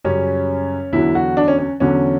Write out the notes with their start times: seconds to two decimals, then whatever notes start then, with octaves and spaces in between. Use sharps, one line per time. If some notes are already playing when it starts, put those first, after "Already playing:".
0.04 F#2 C#3 G3 C#4
0.92 E2 D3 F#3 E4
1.15 F#4
1.37 D4
1.48 C#4
1.59 C#4
1.80 E2 D3 F#3 C#4